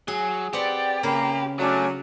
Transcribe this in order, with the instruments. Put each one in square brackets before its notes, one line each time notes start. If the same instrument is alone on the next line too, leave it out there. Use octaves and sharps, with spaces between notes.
[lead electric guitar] F#3 [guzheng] G#4
[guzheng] C4 B4 F#5 [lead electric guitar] G4 [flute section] D5 G5
[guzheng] C#3 [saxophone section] A#3 [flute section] B5
[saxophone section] F#3 [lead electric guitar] A3 [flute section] C#4 D4 G#5